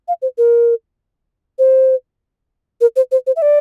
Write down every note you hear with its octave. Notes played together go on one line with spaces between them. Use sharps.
F5
C5
A#4
C5
A#4
C5
C5
C5
E5
D5